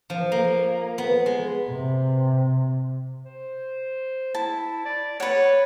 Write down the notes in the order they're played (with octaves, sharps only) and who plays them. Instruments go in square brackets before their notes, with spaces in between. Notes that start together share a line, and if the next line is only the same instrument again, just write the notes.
[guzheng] F3
A#3
B3
G#3
[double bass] C3
[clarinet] C5
[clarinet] E4 [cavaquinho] A5
[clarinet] D5
[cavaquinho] B4 F#5 [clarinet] C#5